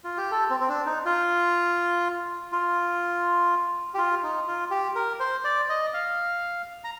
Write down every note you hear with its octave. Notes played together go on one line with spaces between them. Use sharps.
F4
G4
A4
C4
C4
D4
D#4
F4
F4
G4
F4
D#4
F4
G4
A#4
C5
D5
D#5
F5
A#5